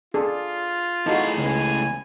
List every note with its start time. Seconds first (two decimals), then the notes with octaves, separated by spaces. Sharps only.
0.14 D4 F4 G#4 A4
1.06 E2 A2 D#4 F#4 G#4 A4 F5
1.38 C#2 G#5